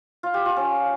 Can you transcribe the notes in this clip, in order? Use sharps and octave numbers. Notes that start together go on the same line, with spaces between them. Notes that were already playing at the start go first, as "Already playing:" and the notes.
F4
G4
F4
C#4